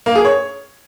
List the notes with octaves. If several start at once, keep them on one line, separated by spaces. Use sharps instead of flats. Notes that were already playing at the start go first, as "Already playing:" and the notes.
A#3
G#4
C#5